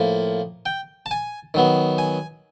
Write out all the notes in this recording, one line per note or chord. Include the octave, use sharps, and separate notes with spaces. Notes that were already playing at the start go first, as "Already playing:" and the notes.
Already playing: A2 F3 A#3
G5
A5
G#5
D#3 F#3 B3
G#5